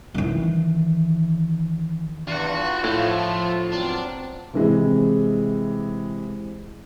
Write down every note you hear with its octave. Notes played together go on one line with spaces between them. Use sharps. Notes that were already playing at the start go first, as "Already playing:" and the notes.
D#3 E3
E2 G2 F4 F#4 F#5
A2 F3 A3
F#3 B3 C4 D4
C3 E3 G#3